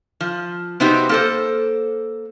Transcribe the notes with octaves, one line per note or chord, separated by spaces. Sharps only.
F3
C3 B3 C4 D#4 F#4 G4
A#3 A4 C5